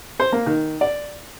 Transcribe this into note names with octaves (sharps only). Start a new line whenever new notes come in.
C5
A#3
D#3
D5